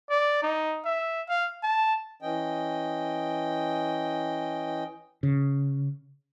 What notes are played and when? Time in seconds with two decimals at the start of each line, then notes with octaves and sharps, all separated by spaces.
0.10 D5
0.43 D#4
0.85 E5
1.29 F5
1.63 A5
2.22 E3 C#4 D#5 G5
5.23 C#3